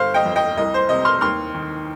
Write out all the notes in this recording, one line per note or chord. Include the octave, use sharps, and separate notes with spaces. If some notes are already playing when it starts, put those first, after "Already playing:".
Already playing: G1 C5 F5
D#5 G5
F2
D#5 G5
C2 D#5
C5
C3 D#5
C6 F6
D#2 C6 F6
D#3